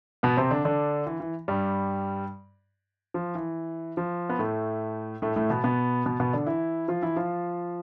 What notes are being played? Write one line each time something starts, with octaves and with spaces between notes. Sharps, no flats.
B2 B3
C3 C4
D3 D4
D3 D4
E3
E3
G2 G3
F3
E3
F3
B3
A2 A3
A2 A3
A2 A3
B2 B3
B2 B3
B2 B3
B2 B3
D3 D4
E3 E4
F3 F4
E3 E4
F3 F4